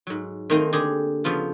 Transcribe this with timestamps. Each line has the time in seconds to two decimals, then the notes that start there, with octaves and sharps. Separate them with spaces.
0.07 G#2 F#3
0.50 D#3 A3 A#3 C4 D#4
0.73 D3 G4 G#4
1.24 C#3 F3 B3 F4 A4